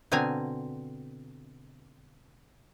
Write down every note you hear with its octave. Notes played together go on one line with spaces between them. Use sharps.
B2 D3 C4 G#5 A#5